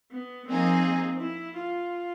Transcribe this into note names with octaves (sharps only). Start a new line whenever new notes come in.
B3
F3 A#3 C4 D#4 G#4
E4
F4